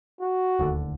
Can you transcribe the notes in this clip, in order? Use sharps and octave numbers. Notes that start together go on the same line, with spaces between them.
F#4
D#1 D2 D3